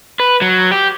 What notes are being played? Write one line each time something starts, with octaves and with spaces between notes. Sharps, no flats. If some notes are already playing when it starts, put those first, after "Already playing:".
B4
F#3
G4